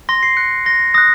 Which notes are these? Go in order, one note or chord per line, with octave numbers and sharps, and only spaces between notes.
C6 A#6
C7
F#6 C#7
C6 A#6
D#6 F#6 A#6